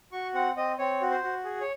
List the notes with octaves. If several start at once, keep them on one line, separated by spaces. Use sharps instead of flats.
F#4 C#6
C4 F#5
C4 D#5
C4 C#5
F#4
C5
F#4
G#4
C#5